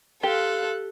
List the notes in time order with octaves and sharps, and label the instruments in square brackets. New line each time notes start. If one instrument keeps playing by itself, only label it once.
[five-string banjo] G4 [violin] A4 F#6 [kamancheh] F5 C6